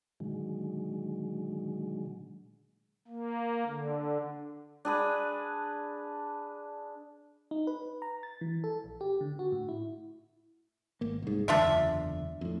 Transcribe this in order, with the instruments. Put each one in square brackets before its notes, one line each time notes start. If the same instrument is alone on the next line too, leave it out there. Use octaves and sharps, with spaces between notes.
[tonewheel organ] A#2 D3 D#3 F#3 G#3
[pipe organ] A#3
D3
[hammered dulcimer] D4 G#4 B4
[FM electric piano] D#4
B4
A#5
A6
E3
A4
A#1
G4
D3
F#4
A2
E4
[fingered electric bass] G#1 A#3
C2 G#2
[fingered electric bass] F#1 E2 D3 [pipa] D4 F4 E5
[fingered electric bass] F2 A2